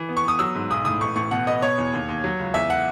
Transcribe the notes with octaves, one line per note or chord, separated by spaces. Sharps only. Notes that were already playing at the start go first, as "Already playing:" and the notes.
Already playing: E3
B3
C#6
B3 D#6
F#3 E6
G#2
B1 D#6
A2 D#6
A1 C#6
A1 C#6
B2 F#5
B3 D#5
B2 C#5
E2
D#2
D#2
F#3
C#2
E2 E5
F#5